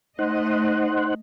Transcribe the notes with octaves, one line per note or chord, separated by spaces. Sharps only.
A3 D#4 C5 D#5 F#5